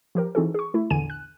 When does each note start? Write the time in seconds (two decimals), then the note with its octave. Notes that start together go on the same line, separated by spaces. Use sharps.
0.15 F3 G4 A#4
0.35 E3 C4 D#4 F#4 G#4 A4
0.54 G#4 C#6
0.74 A3 E4
0.90 A#1 E2 D3 G#5 D#7
1.10 F#6